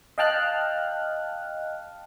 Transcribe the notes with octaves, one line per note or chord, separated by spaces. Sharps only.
D#5 F5 G5 A5 F6 F#6